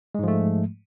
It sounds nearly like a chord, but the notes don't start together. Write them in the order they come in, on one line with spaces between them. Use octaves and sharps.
G#3 G#2 F3 A3